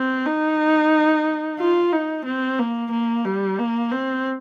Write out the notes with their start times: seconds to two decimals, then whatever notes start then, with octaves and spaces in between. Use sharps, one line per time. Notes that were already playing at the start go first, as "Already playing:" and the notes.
Already playing: C4
0.26 D#4
1.59 F4
1.92 D#4
2.25 C4
2.59 A#3
2.91 A#3
3.25 G3
3.58 A#3
3.91 C4